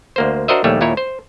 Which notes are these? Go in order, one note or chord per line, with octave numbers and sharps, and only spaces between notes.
D2 A#3 C5
D4 F#4 A#4 C5 D#5 E5
A#1 D#2 G3 A3 C#5
D#2 A#2 E4 C#5
C5